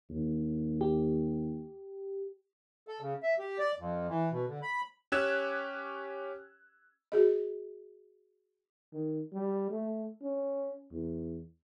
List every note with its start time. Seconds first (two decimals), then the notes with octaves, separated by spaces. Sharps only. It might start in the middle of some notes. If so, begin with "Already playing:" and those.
0.10 D#2
0.81 G4
2.88 A4
3.00 C#3
3.23 E5
3.39 G4
3.59 D5
3.78 F2
4.09 E3
4.31 B2
4.48 D3
4.62 B5
5.12 C#4 G4 E6 F#6 G#6 E7
7.12 F#4 G#4 D#5
8.93 D#3
9.33 G3
9.71 A3
10.22 C#4
10.92 E2